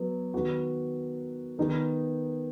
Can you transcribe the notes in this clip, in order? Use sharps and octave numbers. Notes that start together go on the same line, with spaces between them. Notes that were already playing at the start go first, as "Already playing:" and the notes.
Already playing: F#3 B3
D#3 B3 F#4
D#3 B3 D#4 B4